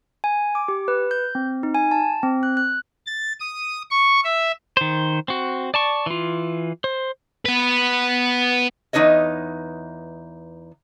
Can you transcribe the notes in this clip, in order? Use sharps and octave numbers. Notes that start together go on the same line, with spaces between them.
G#5
D6
G4
B4
G6
C4
D#4
G#5
A5
C4
F#6
F#6
A6
D#6
C#6
E5
D#3 C5
C4 F#4
D5 A5 C#6
E3 F4
C5
B3 B4
E2 D#4 B4 C#5 D#5